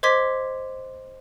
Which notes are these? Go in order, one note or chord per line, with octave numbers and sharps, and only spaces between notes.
C5 D#5 C6 D6 G#6 B6